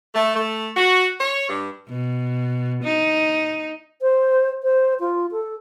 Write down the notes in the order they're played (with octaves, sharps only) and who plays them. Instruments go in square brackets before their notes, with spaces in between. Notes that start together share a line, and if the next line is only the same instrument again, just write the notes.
[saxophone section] A3
A3
F#4
C#5
G2
[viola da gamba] B2
D#4
[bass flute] C5
C5
F4
A4